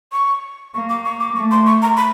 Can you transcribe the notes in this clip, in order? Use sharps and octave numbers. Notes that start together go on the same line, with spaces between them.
C#6
A#3 C#6
D6
C#6
D6
A3 C#6
C6
C#6
A#5
B5